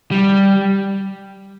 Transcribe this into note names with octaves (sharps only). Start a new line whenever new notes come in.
G3